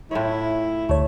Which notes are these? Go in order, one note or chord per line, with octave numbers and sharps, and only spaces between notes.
A2 E4 F4 C#5
D2 A3 C#5